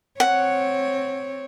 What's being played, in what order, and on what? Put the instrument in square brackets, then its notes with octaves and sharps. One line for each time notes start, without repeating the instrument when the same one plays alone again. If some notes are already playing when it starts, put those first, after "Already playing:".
[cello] C4 C#5 [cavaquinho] F#5